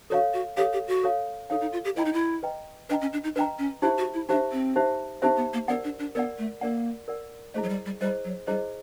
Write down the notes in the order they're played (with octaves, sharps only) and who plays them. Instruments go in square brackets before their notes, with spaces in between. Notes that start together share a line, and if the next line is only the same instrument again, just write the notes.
[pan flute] F#4 [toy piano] A4 C#5 F5
[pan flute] F#4
[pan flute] G4 [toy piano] A4 C#5 F5
[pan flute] G4
F#4
[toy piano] A4 C#5 F5
[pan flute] D#4 [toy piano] A4 C#5 F5
[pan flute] D#4
F4
G4
[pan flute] E4 [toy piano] B4 D#5 G5 A#5
[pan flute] D#4
E4
[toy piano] B4 D#5 G5 A#5
[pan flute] D4 [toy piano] B4 D#5 G5 A#5
[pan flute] C#4
D4
D#4
[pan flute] D4 [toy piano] B4 D#5 G5 A#5
[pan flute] C#4
[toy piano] D#4 G4 C5 E5 [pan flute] E4
[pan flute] F#4
E4
[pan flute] D4 [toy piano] D#4 G4 C5 E5
[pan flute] C4
[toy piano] D#4 G4 C5 E5
[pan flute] C4 [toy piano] D#4 G4 C5 E5
[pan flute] B3
A#3
[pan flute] B3 [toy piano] A#4 D5 F#5
[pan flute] D4
D4
[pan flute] B3 [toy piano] A#4 D5 F#5
[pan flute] A3
[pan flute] A#3 [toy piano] A#4 D5 F#5
[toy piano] A#4 D5 F#5
[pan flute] A3 [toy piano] E4 G#4 C5 D#5
[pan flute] F#3
G3
G3
[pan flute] G3 [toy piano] E4 G#4 C5 D#5
[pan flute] F#3
[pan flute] G3 [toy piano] E4 G#4 C5 D#5